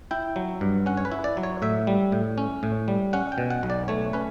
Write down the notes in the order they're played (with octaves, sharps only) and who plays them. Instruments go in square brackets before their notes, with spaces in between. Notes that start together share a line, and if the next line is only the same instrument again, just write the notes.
[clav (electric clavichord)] E4 G5
F#3
G2
C#4 F#5
C#5
B4
E4
D5
F#3
C#5
A2 E5
G3
A2
C#4
A2
G3
C#4 F#5
G5
B2
F#5
B1
D5
A3 C#5
C#4 B4